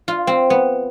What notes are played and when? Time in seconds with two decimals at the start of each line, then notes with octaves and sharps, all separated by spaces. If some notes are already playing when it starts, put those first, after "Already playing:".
0.08 F4
0.27 C4
0.50 B3